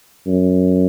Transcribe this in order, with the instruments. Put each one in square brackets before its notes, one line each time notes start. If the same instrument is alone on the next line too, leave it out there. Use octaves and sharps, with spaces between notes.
[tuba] F#2